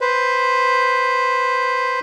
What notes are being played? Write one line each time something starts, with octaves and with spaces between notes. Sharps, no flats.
B4 C5